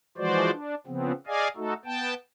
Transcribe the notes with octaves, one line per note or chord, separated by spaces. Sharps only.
E3 F3 G#3 F#4 C5 D5
D4
C#3 F3 B3 C4
G#4 D5 D#5 F5 G#5
A3 D#4 F#4 A4
B3 G5 A5